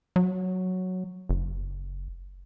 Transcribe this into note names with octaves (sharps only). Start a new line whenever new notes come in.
F#3
F#1